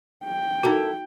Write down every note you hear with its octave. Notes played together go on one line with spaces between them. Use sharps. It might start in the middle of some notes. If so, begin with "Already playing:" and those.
G5
D#4 E4 F#4 A4 A#4